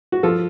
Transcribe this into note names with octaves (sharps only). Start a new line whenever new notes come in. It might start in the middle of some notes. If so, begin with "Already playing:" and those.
F#4
F3 F4 A4